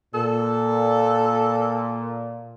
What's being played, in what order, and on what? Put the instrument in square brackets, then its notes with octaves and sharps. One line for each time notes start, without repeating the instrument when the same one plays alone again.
[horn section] A#2 [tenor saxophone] A4